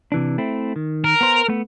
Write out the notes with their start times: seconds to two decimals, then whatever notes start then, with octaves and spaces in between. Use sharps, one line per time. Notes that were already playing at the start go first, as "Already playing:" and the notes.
0.12 C3 E3 D4
0.38 A3 C4 E4
0.76 D#3
1.04 A#4
1.21 B3 C5
1.48 A3 B3